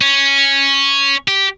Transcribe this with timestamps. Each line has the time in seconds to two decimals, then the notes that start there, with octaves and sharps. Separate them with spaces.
0.01 C#4
1.28 G4